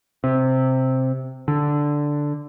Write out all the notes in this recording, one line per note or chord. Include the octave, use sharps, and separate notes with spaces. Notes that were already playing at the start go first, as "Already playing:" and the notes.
C3
D3